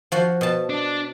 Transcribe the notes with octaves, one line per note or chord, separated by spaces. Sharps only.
F3 F#4
B2 A5
D4